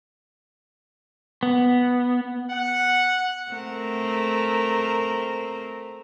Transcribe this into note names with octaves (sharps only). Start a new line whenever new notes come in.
B3
F#5
A3 C4 A#4